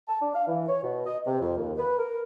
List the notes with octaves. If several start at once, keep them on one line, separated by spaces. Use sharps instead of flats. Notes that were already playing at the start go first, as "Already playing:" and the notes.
A5
D4
F5
E3
C#5
B2
D#5
C3
F2
D#2
B4
A#4